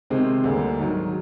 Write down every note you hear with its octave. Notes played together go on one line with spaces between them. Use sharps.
C3 D#3 G#3 C4
D2 D3 G3 A#3
G#2 D#3 F#3